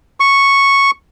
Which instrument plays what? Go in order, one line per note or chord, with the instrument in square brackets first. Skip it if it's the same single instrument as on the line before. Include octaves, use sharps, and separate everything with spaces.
[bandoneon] C#6